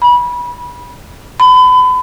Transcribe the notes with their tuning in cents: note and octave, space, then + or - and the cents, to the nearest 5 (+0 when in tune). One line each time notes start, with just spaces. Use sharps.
B5 -25
B5 +30